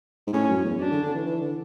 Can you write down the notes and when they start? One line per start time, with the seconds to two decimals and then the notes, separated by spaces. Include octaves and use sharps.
0.27 G#2
0.33 A2 C#4
0.49 F#2
0.65 E2
0.80 F#2 D4
0.91 D3
1.03 D3
1.15 E3
1.26 E3
1.41 D3